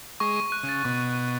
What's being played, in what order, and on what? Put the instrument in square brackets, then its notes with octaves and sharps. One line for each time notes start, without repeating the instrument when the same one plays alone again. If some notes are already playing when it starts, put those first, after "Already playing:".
[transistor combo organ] G#3 [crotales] C#6
[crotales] D#7
F#6
[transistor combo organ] C#3
[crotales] A6
[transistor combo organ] B2 [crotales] C#6
[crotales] D#7
F#6